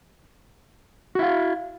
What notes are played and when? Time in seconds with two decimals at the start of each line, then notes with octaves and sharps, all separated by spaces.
1.15 F#4
1.19 E4
1.23 F5